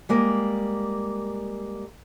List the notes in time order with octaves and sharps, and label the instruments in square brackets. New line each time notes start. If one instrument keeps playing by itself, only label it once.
[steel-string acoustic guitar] G3 G#3 A#3